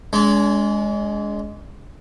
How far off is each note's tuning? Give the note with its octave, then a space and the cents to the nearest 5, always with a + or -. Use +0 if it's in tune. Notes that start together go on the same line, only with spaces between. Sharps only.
G#3 +0 D4 -45